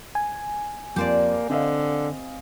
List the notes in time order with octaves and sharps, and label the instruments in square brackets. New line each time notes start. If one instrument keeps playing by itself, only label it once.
[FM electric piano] G#5
[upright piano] F2 [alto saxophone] A#3 [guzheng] G4 C5 D5
[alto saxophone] D3 [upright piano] C4 D#5 F5